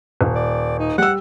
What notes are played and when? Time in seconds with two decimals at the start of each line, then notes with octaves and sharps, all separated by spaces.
0.21 D#1
0.35 D5
0.79 D#4
0.98 G3 F#5 E6